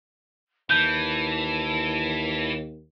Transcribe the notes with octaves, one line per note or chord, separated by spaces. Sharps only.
D#2 E3 A5 G6